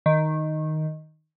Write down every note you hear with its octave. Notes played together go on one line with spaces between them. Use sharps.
D#3